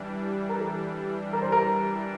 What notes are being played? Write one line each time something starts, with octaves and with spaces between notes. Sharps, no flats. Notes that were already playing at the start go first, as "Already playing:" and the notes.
Already playing: E3 G3 D4
A#4
A4
A#4
C5
A#4